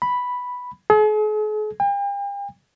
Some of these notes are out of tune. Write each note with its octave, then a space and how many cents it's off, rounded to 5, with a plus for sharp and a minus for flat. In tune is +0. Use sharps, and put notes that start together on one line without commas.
B5 +0
G#4 +45
G5 +40